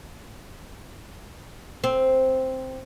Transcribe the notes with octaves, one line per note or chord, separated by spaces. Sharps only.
C4